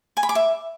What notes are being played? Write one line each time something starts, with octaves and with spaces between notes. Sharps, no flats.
G#5
B5
D6
E5